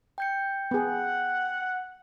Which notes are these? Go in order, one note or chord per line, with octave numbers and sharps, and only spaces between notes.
G5 G6 C#7
B3 G#4 F#5